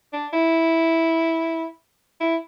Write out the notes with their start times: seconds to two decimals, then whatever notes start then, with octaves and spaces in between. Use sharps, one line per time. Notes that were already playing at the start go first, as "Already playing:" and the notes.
0.13 D4
0.33 E4
2.21 E4